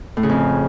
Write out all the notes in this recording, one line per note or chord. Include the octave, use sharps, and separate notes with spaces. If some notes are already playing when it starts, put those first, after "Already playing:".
A2
C#3
F2